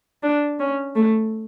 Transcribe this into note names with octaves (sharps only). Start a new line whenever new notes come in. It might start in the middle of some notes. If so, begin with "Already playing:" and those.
D4
C#4
A3